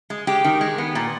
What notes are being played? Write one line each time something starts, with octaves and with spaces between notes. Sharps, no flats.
G#3
G#3 G4
D#3
G#3
B3
A#2